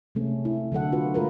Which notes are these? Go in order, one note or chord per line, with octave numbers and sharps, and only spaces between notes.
C3 G#3 A3 C#4
E4
D3 F#3 A4 F#5
F4 F#4 B4
G#3 A3 F4 A#4 B4